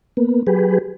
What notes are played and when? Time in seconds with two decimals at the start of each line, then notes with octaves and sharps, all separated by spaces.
0.17 A#3 B3
0.47 F#3 G4 G#4 B4